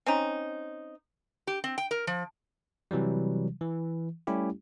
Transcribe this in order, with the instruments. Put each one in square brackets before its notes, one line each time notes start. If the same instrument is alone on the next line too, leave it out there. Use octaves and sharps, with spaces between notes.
[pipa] C4 C#4 D#4
[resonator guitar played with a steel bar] G4
C4
G5
A#4
F3
[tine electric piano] C3 E3 F#3 G3
E3
G3 A3 C#4 E4 G4